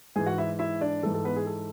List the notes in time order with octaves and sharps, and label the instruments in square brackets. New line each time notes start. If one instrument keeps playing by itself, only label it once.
[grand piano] G#2 E3 G#4 G#5
F#4 F#5
E4 E5
E4 E5
D4 D5
E3 A4
G#2
A4
B3 B4
G#4
A4